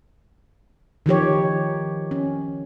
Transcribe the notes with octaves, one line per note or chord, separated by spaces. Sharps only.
D#3 F3 G4 C#5
C#4